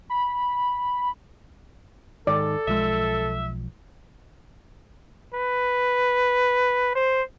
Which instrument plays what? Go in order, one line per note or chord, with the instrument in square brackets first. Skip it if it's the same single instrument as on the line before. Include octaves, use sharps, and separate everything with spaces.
[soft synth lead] B5
[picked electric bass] G#2 D#3 [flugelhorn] A4 [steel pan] D5
[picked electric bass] B1 F3 G#3 [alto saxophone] E5
[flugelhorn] B4
C5